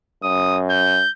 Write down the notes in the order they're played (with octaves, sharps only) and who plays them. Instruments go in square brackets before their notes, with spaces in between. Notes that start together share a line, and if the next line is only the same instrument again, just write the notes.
[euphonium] F#2 [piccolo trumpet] D#6
[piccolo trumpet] G6